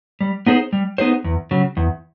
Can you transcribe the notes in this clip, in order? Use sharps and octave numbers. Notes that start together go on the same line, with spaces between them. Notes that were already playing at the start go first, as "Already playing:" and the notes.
G3
B3 D#4 G#4 C5
G3
B3 D#4 G#4 C5
E2
C#3 F#3
E2